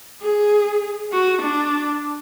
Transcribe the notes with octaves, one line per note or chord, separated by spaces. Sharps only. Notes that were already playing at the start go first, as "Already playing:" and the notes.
G#4
F#4
D4